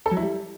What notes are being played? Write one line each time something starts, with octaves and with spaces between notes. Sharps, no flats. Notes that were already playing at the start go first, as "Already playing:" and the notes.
A4
F#3
E4
G3